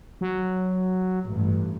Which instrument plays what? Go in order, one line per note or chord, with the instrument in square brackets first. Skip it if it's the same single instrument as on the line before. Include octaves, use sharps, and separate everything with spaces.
[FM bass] F#3
[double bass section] A1 G2